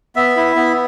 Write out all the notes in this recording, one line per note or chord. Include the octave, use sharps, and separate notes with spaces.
B3 E5
E4
B3